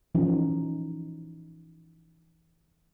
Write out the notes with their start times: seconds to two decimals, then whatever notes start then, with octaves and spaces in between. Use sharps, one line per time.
0.15 E3 F3 C#4 D#4